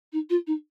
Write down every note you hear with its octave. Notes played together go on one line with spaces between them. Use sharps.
D#4
F4
D#4